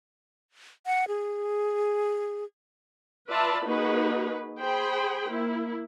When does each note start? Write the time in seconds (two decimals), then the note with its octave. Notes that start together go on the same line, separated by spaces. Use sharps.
0.86 F#5
1.08 G#4
3.30 F4 B4 D5 E5 A5 B5
3.66 A#3 D#4 F#4 G#4 B4
4.59 G#4 C5 G5 B5
5.25 A#3 E4